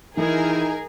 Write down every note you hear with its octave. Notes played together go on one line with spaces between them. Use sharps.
D#3 E3 D#4 E4 G#4 A#4